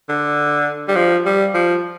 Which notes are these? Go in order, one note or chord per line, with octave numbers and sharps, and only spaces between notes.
D3
G3
F3
G3
F3